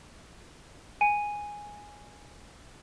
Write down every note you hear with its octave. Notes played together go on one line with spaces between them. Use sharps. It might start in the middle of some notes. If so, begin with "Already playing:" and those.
G#5 D#7